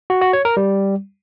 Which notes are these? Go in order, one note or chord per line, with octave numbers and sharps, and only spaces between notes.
F#4
F#4
C#5
A#4
G3